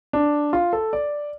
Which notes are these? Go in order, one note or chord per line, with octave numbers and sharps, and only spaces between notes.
D4
F4
A4
D5